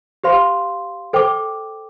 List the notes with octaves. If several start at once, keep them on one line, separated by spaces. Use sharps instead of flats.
G4 C5 F5 C6
A4 C5 G5 D6